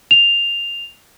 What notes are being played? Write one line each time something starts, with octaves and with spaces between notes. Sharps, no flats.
F7